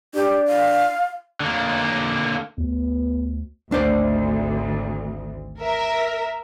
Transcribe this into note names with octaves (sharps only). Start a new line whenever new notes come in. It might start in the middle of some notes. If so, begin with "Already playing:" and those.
D4 G4
F5
D3 A#3
D2 B3
G#1 D2 D4 C5 D5
A#4 E5